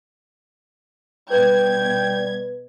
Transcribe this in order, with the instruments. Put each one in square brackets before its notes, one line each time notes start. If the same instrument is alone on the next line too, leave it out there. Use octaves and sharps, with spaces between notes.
[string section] B2 G#6 [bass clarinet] G3 [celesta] B4 [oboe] G5